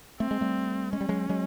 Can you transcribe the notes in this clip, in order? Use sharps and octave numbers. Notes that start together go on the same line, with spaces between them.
A3 C4
G#3
G3 A3
G#3 C#4
G3
F#3 G#3
F#3 G#3